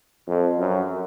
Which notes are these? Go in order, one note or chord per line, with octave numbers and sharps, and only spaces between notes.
F2
F#2